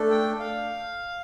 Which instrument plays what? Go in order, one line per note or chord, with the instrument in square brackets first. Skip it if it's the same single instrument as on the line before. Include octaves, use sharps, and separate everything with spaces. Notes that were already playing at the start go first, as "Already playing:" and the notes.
Already playing: [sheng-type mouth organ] A3 D4 A4
G5
F5